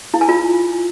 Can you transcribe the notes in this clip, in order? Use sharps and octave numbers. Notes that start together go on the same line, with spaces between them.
E4
G#5
F4